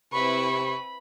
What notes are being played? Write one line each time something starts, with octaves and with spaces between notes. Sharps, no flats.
C3 C4 E4 B4 B5 C#6